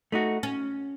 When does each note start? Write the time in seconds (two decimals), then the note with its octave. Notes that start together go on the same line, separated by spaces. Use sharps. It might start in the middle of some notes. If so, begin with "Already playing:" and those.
0.12 A3 D#4 F#4
0.43 C#4